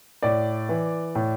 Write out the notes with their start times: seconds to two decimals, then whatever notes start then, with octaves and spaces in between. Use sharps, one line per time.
0.22 A2 D5
0.69 E3
1.15 A2